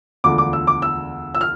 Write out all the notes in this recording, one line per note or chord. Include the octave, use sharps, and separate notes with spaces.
E1 D2 D3 F3 D6
D6
E6
D6
E6
E6
F6